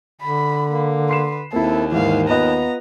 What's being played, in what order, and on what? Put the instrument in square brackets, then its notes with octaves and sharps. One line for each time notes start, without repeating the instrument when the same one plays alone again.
[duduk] D3 [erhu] B5
[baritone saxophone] A#3
[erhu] B4 [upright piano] C6 C7 E7
[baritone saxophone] D#2 [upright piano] A#3 C4 E4 [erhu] A4
[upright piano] G#2 E3 [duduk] D#3 [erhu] F5
[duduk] B3 [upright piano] F4 B4 D#5 [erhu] A#5